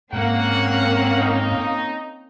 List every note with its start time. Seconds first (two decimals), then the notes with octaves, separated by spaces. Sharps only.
0.13 G#2 A#3 C4 C#4 F#5 F6
1.19 D#4